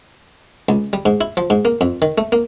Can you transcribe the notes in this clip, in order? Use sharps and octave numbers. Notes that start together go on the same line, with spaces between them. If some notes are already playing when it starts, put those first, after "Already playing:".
C#2
G3
G#2
E4
F3
G#2
A#3
F2
D#3
A3
A#3